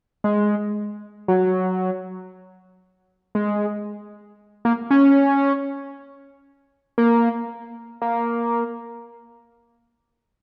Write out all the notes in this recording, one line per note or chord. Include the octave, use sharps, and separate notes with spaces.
G#3
F#3
G#3
A#3
C#4
A#3
A#3